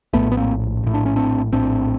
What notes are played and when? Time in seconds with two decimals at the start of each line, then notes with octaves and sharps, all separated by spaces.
0.13 A#1 A2 A3 B3
0.32 B3
0.37 A#3 C4
0.83 A#1 A2
0.94 D4
1.05 C#4
1.16 C4 D4
1.52 A#1 A2 C4 D4